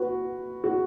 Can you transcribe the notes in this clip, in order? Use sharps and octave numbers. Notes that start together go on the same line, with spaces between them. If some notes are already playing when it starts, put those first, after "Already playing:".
Already playing: F#4 B4
F#4